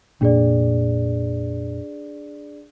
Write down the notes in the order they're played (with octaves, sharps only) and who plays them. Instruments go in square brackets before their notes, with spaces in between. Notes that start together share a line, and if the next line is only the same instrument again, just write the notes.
[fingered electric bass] F1 A#2 [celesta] D4 G#4 D5